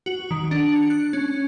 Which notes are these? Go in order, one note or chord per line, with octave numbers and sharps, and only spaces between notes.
F#4
D#3
D4
C#7
F#6
C#4